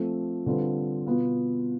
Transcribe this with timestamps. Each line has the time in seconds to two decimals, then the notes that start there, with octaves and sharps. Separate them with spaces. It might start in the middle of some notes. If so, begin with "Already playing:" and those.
Already playing: F3 A3 C4
0.46 D3 G3 C4 F4 B4
1.06 B2 B3 F4